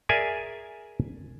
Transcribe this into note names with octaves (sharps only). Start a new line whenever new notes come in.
G#4 A#4 D5 E5 G#5